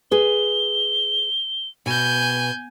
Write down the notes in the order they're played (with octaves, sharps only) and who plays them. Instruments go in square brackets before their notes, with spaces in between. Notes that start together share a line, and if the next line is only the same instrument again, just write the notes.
[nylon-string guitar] G#4 B4 [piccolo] G7
[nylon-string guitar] B2 [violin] G#5 G6